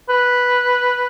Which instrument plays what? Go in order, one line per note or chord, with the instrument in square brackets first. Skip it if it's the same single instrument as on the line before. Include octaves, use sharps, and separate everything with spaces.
[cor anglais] B4